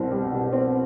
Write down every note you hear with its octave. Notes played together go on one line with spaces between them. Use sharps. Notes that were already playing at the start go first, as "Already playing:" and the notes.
Already playing: C2 B2 C4
G3
B2
C4